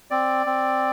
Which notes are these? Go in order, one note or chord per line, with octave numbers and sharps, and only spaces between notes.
C4 D5
C4